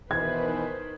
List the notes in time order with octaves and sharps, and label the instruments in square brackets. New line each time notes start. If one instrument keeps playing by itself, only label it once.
[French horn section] B2 E3 [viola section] D#3 B4 C5 [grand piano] G#6